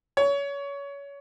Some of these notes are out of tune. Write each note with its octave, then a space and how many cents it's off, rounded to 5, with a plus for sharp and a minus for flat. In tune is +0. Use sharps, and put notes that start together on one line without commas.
C#5 +25